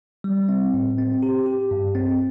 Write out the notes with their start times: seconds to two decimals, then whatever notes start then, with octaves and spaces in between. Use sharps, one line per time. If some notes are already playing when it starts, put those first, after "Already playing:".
0.24 G3
0.49 C4
0.74 A2
0.98 C4
1.23 G4
1.46 G4
1.71 G2
1.95 C4